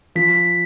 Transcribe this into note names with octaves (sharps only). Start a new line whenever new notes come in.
F3 B6